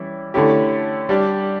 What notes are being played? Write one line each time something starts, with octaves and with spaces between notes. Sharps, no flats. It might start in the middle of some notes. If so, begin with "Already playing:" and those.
Already playing: E3 G3 C#4 E4
D3 A3 C#4 E4 G4
G3 D4 G4